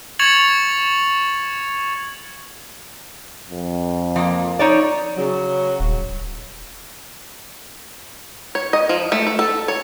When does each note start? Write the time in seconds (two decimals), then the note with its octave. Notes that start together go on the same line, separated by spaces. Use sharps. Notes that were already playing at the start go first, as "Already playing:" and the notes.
0.19 C#6 G#6 A6 C#7 F7 F#7
3.50 F2
4.16 F3 A#3
4.59 D#4 C#5 D5
5.17 C#3 F#3
5.79 D#1
8.55 C#5
8.73 D#5
8.89 F3
9.12 A3
9.27 A3
9.39 A4
9.68 C#5